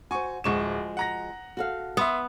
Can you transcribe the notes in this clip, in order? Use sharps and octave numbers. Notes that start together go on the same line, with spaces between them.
F#4 C5 G#5 C#6
D1 F3 G#3 F#4 C#6 E7
F#5 A#5 A#6
F#4 A4 F5
B3 E5 C6 D#6